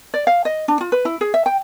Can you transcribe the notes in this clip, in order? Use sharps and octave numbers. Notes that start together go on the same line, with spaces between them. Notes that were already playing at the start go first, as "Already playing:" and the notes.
D5
F5
D#5
D4
F4
B4
E4
G#4
E5
G5